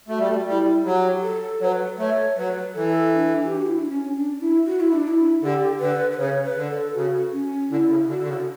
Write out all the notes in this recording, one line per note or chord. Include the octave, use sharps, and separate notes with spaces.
A3 F#4
G3
A3
G3 E4 F#4
F#3 G4
A4
F#3 B4 C#5
A3 C#5
F#3 B4
E3 A4
D4
G4
F#4
E4
D4
C#4
D4
E4
F#4
E4
D4
E4
D3 G4 A4
D3 B4
B4
C#3 C#5
B4
D3
A4
C#3 F#4
C#4
D3 E4
C#3
D3 F#4
D3
C#3